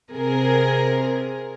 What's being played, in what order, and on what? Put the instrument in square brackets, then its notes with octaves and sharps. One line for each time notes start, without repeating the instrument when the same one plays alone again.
[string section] C3 G#4 A#4